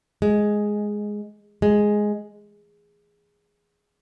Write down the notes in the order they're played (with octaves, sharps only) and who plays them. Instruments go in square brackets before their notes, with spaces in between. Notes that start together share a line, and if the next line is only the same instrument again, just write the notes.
[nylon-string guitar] G#3
G#3